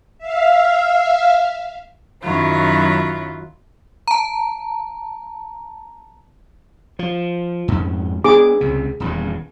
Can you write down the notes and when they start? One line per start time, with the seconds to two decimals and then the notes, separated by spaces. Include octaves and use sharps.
0.18 E5 F5
2.24 F#2 D#3 F#3 E4 F4
4.08 A5 A#5
6.99 F3
7.68 F2 G#2
8.24 B3 D4 G#4 D6
8.61 C#2 C3
9.00 D#1 E2 G2